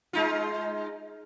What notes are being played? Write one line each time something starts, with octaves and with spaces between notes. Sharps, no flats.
G#3 D#4 F4